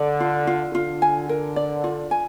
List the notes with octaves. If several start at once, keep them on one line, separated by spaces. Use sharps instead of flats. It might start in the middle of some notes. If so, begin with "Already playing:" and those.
Already playing: D3 D5
F4
F4
D3 F4
G#5
A#4
D5
F4
G#5